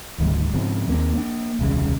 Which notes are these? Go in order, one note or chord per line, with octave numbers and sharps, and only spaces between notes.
D1 G#1 D2 G3
G#2 C#3 F3 C4
D#2 A#3 C4
A#3 D4
D#1 C2 C#3